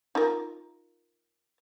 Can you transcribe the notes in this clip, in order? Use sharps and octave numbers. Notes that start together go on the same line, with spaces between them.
D#4 F4 A#4